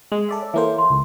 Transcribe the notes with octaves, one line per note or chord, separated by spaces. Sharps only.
G#3
A4 D5 E5
C#5
E3 A#3 A4 C5 C#5 E5
C6
C#2